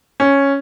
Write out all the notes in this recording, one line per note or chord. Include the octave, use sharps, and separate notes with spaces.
C#4